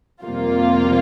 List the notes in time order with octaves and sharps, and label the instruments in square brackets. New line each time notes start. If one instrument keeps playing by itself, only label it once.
[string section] F2 C3 G3 A#3 F4